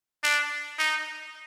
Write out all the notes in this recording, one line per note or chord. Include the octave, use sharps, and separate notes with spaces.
D4
D#4